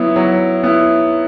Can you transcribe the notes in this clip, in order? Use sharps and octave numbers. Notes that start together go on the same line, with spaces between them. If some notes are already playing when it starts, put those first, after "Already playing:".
Already playing: F#3 B3 E4
F#3
B3 E4